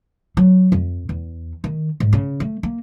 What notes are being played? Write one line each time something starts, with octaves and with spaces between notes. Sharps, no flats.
F#3
F2
E2
D#3
G#2
C#3
A3
A#3